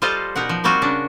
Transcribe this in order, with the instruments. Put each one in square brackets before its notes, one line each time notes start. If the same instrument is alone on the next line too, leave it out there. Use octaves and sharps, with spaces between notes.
[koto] G3 F4 A4 C5 D#5 F5
B2 D#4 A#4 F#5
F3
G3 A#3 C4 F4 F#4
C#3 D4